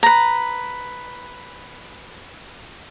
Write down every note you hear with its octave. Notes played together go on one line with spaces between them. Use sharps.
B4 A#5